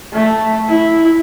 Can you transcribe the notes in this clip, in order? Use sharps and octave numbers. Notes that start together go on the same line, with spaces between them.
A3
E4